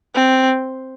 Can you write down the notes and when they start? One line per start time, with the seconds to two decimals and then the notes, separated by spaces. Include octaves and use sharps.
0.15 C4